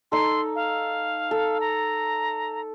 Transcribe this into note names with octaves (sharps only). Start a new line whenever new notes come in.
D#4 A4 C6
F5
A4
A#5